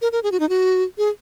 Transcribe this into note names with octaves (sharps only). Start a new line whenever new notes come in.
A#4
A#4
G#4
F#4
D#4
F#4
G#4